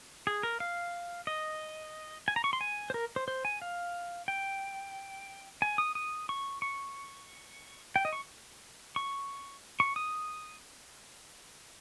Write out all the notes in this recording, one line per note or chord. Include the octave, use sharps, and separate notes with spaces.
G#4
A#4
F5
D#5
G#5
A#5
C#6
C6
G#5
C5
A#4
C5
C5
G#5
F5
G5
G#5
D#6
D#6
C#6
C#6
G5
D#5
C#6
C#6
C#6
D#6